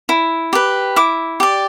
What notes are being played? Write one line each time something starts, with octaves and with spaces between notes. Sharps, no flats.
E4
G4 B4
E4 D6
G4 D5